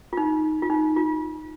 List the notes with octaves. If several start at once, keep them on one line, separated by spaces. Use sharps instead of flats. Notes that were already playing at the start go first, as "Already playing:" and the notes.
F4
D#4
F4
D#4
F4